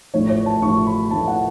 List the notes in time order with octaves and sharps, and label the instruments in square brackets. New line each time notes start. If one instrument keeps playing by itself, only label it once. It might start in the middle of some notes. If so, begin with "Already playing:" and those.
[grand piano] A1 A2 F3 C#5
C#5
A5
A1 A2 F3 C#6
B5
A1 A2 F3 A5
F#5